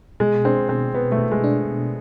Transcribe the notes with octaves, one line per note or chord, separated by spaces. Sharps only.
B2 G#3
C4 D4
B2 C4
B2 B3
A3
B2
G#3
D4
B2